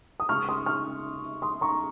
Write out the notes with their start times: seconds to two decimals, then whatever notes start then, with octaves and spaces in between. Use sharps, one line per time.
0.20 D#6
0.29 C#3 G#3 C#6 F6
0.49 C6 D#6
0.66 C#6 F6
1.42 C6 D#6
1.61 A#5 C#6